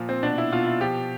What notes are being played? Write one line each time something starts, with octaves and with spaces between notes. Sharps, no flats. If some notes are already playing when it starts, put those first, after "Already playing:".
Already playing: A#2 F3
C4
B2 D4
E4
B2 F4
E4
F3 G4